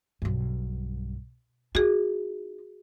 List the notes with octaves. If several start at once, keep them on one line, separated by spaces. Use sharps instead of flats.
B1 G2
D#4 F4 F#4 G#4